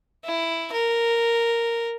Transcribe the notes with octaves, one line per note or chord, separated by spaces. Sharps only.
E4
A#4